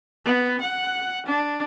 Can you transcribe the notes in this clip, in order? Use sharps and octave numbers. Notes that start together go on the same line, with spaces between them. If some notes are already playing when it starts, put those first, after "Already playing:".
B3
F#5
D4